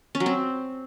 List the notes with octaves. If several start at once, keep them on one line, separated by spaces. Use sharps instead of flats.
C#4
F#3
C4